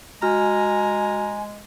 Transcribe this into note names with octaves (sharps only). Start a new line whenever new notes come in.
G#3 F#4 G#5 A#5 F6